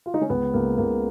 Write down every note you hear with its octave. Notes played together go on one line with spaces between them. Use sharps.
F4
D#4
C#4
C#2 B3
C#2 A#3
C#2 A#3